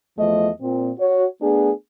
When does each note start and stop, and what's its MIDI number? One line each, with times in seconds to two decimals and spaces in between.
0.18 0.49 40
0.18 0.49 53
0.18 0.49 57
0.18 0.49 75
0.60 0.90 46
0.60 0.90 60
0.99 1.26 66
0.99 1.26 73
1.41 1.71 57
1.41 1.71 59
1.41 1.71 62
1.41 1.71 68